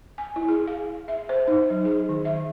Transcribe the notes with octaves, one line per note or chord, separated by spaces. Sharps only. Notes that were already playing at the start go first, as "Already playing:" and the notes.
G#5
E4
G#4
F5
E5
C5
D#4
F#3
G#4
D#3
E5